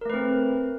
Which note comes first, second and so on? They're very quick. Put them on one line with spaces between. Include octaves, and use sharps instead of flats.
A#4 A3 B4 C4